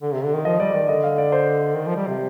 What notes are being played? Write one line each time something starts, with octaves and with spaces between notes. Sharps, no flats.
D3
C3
D3
D#3
F3 D#5
G3 D5
D#3 D5
D3 D#5
F5
D5
C5
D#3
F3
G3
C3